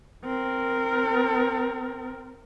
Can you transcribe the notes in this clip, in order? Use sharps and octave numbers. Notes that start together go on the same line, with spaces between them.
C4 A#4